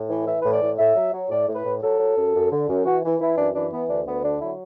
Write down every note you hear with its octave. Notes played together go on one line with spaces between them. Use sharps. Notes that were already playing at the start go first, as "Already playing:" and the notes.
Already playing: A2
E3
E3 E5
A2 B4
D5
A2
A2 E5
F#3
F#3
A2 D5
A2
B4
A2
F#3 A4
F#3
F#2
F#2
D3
F#2
E3 F#4
E3
E3 E4
F#2 D4
E3 D4
E3 B3
D2 D4
D2 B3
D3 D4
F#3 E4